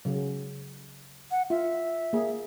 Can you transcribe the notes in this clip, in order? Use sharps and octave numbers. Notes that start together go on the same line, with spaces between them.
C#3 F#3
F#5
F4 E5
A#3 G#4